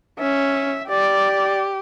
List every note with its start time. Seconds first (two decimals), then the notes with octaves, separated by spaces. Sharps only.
0.19 C#4 E5
0.89 G4 D5